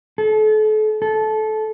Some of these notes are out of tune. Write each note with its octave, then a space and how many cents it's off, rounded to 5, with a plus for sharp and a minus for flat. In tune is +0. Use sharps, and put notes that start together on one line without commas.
A4 -35
A4 -20